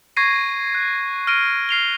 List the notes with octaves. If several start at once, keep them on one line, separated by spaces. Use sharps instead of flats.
C#6 G#6 A#6 C7 D#7
F#6
F6 A#6 D7 D#7
F6 C7 F7 G7